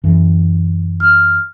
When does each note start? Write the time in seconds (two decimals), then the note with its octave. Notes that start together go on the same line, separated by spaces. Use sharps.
0.04 F#2 E3
1.00 F6